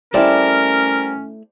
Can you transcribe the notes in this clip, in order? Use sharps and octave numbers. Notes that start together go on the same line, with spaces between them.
G3 A3 C4 C#4 E4 A#4 D5